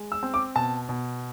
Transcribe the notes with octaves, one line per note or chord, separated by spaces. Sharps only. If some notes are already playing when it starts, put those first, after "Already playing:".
Already playing: G#3
E6
C4
D6
B2 A5
B2